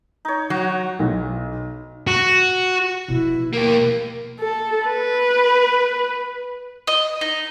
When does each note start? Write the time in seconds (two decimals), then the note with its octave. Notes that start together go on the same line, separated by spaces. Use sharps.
0.25 D#4 C#5
0.50 F#3 F#4
0.99 B1
2.07 F#4
3.08 B2 F3 E4
3.53 A#3 G4 A#4
4.39 A4
4.86 B4
6.87 D#5
7.21 D#4